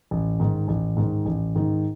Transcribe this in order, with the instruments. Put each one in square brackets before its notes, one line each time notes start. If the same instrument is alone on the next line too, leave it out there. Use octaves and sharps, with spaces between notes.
[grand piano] A1
G#2 D#3
A1
G#2 D#3
A1
G#2 D#3